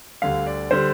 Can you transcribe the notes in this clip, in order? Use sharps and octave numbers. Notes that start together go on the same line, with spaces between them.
D2 D3 G3 F5
D5
D3 G3 C5